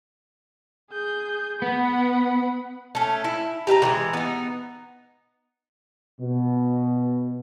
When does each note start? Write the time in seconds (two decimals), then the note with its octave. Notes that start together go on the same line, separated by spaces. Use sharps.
0.91 G#4 G6
1.62 B3 F#5 B5
2.95 A3 C#4
3.24 E4
3.67 G4 B4 E5 A#5
3.82 D3 E3 G#3
4.13 B3 D#4
6.20 B2